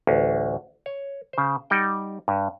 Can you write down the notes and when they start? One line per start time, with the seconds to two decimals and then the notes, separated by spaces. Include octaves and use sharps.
0.07 A1 D2
0.86 C#5
1.33 C#3 C5
1.70 G3 D#4 F#5 G5
2.28 G2